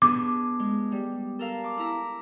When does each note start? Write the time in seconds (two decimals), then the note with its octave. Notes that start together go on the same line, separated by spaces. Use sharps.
0.02 B3 D4 G#4 D6
0.59 G#3
0.92 G3
1.39 A4 A#4 F5
1.64 D6
1.78 E4 A#5